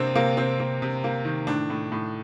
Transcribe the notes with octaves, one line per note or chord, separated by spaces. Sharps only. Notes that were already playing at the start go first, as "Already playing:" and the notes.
Already playing: C3 A#3 C4 D4
C3 A#3
C3 C4
A#3
C3
A#3
D#3
A2 D4
A2
A2